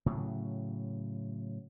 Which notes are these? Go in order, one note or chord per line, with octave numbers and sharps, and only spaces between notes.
A2 C#3 F#3